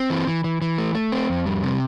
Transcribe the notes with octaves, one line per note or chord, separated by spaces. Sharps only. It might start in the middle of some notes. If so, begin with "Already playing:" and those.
Already playing: C4
E3
E3
E3
E3
A3
A3
C4
F2
G3
C3